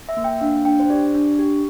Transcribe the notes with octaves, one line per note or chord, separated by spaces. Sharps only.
E5
A#3
G5
D4 F5
D4 G5
C5
G4 D5
D4
G4